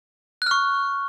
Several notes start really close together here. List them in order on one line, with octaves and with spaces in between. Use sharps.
F#6 F6 C#6